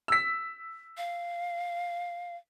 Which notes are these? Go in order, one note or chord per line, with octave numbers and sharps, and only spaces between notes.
E6 B6
F5